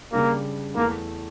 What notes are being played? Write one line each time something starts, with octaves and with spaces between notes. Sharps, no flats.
C#3 G3 A#3 D4 G4
E2 E3 A3 A#3